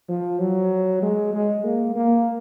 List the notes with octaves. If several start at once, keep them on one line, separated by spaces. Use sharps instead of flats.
F3
F#3
G#3
G#3
A#3
A#3